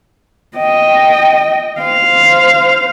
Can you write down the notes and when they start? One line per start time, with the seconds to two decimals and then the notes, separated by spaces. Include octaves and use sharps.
0.57 D#5 G5
1.79 C5 F5